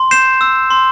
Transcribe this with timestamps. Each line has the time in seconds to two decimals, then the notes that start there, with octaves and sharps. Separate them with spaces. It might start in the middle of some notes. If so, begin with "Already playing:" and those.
Already playing: C6
0.11 G6 C7 E7
0.41 E6
0.70 C6